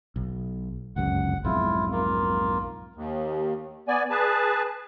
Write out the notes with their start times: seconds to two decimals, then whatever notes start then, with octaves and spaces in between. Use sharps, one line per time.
0.16 B1
0.96 G1 C#2 F#2 F#5
1.44 B1 F2 G#2 E4 F4
1.92 A#3 F4
2.96 D#2
3.88 B3 D5 G#5
4.10 G#4 B4 A5